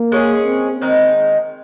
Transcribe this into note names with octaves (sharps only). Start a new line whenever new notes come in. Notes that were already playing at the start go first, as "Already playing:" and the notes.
Already playing: A#3
G#3 C#4 G#4
C4
D#3 G#3 C4 D#4